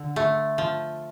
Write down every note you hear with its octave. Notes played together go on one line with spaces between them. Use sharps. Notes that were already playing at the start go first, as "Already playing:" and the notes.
Already playing: D3
A3
F3